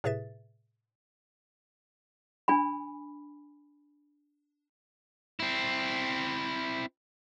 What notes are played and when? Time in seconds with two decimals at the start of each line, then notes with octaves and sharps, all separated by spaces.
0.04 A2 C3 G#4 B4 E5 A6
2.48 D4 G#5 B5
5.40 C4 E4